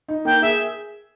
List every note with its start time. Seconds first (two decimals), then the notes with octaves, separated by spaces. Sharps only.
0.08 D#4
0.25 A#3 G5
0.42 G#4 E5